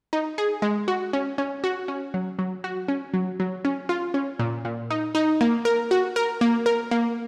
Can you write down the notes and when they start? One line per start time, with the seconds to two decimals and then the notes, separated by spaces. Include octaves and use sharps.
0.13 D#4
0.38 G#4
0.62 G#3
0.88 F#4
1.13 C#4
1.38 C#4
1.64 F#4
1.88 C#4
2.14 F#3
2.39 F#3
2.64 F#4
2.88 C#4
3.14 F#3
3.40 F#3
3.65 C#4
3.89 F4
4.14 C#4
4.39 A#2
4.65 A#2
4.90 D#4
5.15 D#4
5.41 A#3
5.65 A#4
5.91 F#4
6.16 A#4
6.41 A#3
6.66 A#4
6.91 A#3